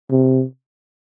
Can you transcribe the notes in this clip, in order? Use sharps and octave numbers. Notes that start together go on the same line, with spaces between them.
C3